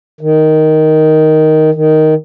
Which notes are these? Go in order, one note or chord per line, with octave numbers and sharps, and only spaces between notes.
D#3
D#3